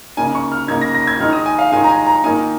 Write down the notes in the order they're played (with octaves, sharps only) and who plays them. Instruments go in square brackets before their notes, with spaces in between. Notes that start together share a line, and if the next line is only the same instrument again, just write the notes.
[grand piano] C#3 A#3 D#4 G#5
C#6
F6
C#3 A#3 D#4 G#6
A#6
A#6
G#6
D#3 G#3 D#4 F6
D#6
G#5
F5
D#3 G#3 D#4 G#5
A#5
G#5
A#5
D#3 A#3 D#4 G#5